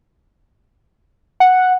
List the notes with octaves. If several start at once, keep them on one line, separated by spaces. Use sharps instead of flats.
F#5